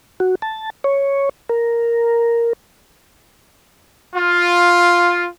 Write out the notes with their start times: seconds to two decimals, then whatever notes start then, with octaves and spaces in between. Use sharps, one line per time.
0.20 F#4
0.42 A5
0.84 C#5
1.49 A#4
4.16 F4